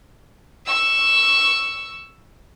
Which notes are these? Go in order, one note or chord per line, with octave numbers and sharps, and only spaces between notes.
C#6 E6